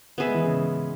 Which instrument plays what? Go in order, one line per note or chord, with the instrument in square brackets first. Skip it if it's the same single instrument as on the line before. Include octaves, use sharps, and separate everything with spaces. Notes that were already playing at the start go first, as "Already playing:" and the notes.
[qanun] B3 G#4 E5
[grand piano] G#3
E3
C#3